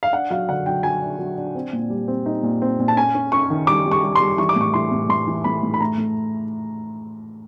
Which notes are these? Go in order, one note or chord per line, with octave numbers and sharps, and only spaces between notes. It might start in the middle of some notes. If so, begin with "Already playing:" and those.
F5
D4 F#5
F#3 F5
D3 F#5
F#3 G5
F#3 G#5
D4
F#3
D4
C4
A#2
G3
C4
D#4
A#2
C4
A#2
A5
C#4 G#5
C#4
C#4 C#6
D#3
G3 D6
G3
C#6
G3
C6
G3
E3 C#6
D6
A2 C#6
E3 C6
A2
A2 C6
E3
A2 B5
A2
B5
A3 A#5
A3